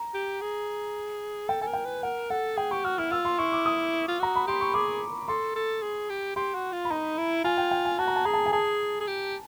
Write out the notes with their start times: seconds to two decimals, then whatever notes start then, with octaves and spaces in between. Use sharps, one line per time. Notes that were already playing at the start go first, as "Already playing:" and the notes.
Already playing: A#5
0.14 G4
0.41 G#4
1.49 A4 G5
1.61 A4 G#5
1.67 A#4
1.73 G5
1.85 B4
2.03 A#4 F#5
2.30 A4 F#5
2.57 G#4 G5
2.71 G4 C#6
2.84 F#4 F6
2.98 E4 F6
3.11 F4 E6
3.25 C6
3.38 E4 C#6
3.52 D6
3.66 D#6
4.08 F4
4.19 F#4 A#5
4.36 B5
4.47 G4 C6
4.61 C#6
4.74 G#4 D6
5.28 A4 C6
5.55 A4
5.82 G#4
6.10 G4
6.36 G4 C6
6.55 F#4
6.72 F4
6.85 B5
6.90 D#4 A#5
7.18 E4
7.44 F4 G#5
7.58 G5
7.71 G5
7.85 G#5
7.99 F#4 A5
8.08 A#5
8.16 A5
8.25 G#4 A#5
8.33 A5
8.46 G#5
8.52 G#4 A5
9.00 G#4
9.07 G4